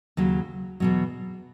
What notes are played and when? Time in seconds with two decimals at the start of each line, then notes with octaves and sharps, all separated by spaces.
0.17 D#2 C#3 F#3
0.80 E2 B2 F#3